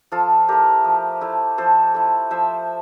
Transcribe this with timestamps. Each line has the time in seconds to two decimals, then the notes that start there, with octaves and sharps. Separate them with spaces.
0.12 F3 F4 A4
0.48 A3 E4 G4 A#4
0.85 F3
1.21 A3 E4
1.58 F3 A4 C5
1.94 A3 E4
2.30 F3 C5 E5